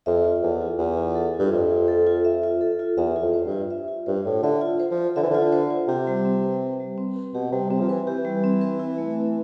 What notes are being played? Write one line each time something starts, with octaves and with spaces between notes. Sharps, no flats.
F2 E5
F4
E2 A4
F4
E2 E5
F4
A4
F4
G2
F2 E5
F4
A4
F4
E5
F4
A4
F4
E2 E5
F4
F2
C5
G2
F4
E5
F4
G2 C5
A2 F4
D3 E5
F4
C5
F3
F4
D3 E5
E3
D3 F4
C5
F4
C3 G4
G3
C4
B4
G4
G3
C4
B4
B2 G4
C3 G3
C3 C4
F3
E3 B4
E3 G4
G3
C4
B4
E4
A3
C4